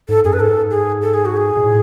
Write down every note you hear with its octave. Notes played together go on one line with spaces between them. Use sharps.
G#2 A4
F#2 G#4
B4
G#2 A4
G#4
A4
G#4
F#4
G#4
B2
A2